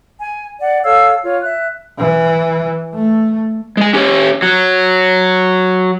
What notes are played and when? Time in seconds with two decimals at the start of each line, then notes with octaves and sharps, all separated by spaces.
0.19 G#5
0.60 D5 F#5
0.84 A4 C#5 F5 E6
1.22 F4 C#5
1.43 E5 F#6
1.99 E3
2.94 A3
3.77 G#3 G#5
3.94 C#4 G4 C#5
4.42 F#3